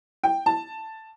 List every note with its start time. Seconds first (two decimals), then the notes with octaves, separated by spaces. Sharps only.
0.24 G5
0.46 A5